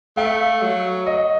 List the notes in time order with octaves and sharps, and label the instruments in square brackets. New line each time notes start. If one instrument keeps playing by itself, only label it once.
[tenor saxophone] A3 [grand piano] F5
[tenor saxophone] F#3
[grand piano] D#5